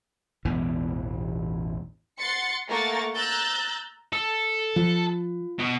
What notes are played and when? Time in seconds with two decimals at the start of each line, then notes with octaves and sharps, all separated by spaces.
0.45 A1 E2 B2 E3
2.19 F#5 C6 A6 C#7
2.67 A3 A#3 A#4 F#5 C#6 A6
3.15 A#5 E6 F#6 G6 A6
4.12 A4
4.76 F3 F4
5.59 B2